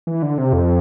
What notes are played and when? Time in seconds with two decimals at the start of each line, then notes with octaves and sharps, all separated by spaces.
0.07 E3
0.22 D3
0.38 C3
0.53 F2